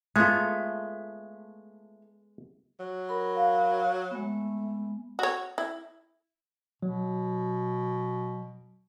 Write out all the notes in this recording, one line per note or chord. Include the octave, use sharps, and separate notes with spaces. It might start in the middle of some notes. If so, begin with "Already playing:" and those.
G#3 A3 B3 F4
F#3
A#4 B5
F5
G#3 A3 B3
F#4 C#5
E4
B2 F#3